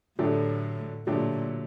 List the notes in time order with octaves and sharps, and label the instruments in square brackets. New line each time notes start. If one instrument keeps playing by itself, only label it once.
[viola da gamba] A2 [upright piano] D3 F#3 A3 D4 G4
[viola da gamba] A#2 [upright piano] D3 F#3 A3 D4 G4